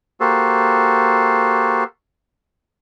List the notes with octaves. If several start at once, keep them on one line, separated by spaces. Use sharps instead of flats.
A#3 F#4 G4 A4 C5